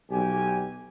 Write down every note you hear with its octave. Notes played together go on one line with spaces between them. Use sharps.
B1 G4 G#5